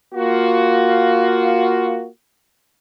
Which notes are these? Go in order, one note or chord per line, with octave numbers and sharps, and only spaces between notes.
A#3 F4 F#4